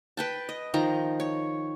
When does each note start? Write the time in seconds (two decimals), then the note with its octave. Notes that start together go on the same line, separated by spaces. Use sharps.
0.17 B4 G5 A5
0.49 D#5
0.74 D#3 F3 A#5
1.20 C#5